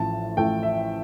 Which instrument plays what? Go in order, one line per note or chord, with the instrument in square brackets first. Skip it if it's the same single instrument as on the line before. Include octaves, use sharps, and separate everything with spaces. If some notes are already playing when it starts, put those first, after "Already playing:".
Already playing: [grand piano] A1 A2 F3 A3 A5
A1 A2 F3 A3 G5
E5